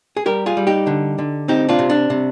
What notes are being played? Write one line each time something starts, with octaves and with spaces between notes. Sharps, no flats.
G#4
G3 G4 A#4
F4 G#4
G3
D#4 G4
D3
D3
C4 D#4 G4
D4 F4
C3
D4
C3